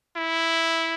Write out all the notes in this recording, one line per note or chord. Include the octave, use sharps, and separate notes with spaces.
E4